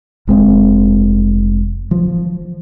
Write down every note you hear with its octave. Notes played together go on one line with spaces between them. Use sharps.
F1 G#3 C4
F3